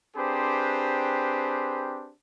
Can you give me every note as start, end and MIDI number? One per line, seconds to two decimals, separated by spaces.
0.16 2.11 60
0.16 2.11 62
0.16 2.11 67
0.16 2.11 68
0.16 2.11 71
0.16 2.11 72